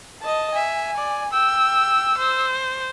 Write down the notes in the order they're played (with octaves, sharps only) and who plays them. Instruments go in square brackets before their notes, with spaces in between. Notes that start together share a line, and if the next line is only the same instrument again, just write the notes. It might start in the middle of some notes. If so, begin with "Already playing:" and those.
[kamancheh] D#5 A5
[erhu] E5 [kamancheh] G#5
[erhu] D5
[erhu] G5 [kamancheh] E6
[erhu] C5